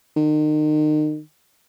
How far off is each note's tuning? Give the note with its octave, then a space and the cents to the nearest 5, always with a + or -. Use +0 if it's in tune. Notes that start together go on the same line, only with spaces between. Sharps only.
D#3 -35